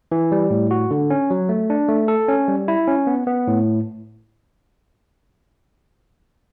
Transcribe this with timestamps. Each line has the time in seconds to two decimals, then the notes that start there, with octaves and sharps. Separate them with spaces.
0.12 E3
0.32 G3
0.50 A2
0.71 F#4
0.91 D3
1.10 C#4
1.30 F#3
1.49 A3
1.70 D4
1.88 A3
2.08 A4
2.28 C#4
2.48 G3
2.68 E4
2.87 C#4
3.07 B3
3.27 B3
3.47 A2